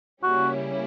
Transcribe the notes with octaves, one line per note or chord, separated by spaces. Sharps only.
C#3 G3 A#3 C#4 E4 F#4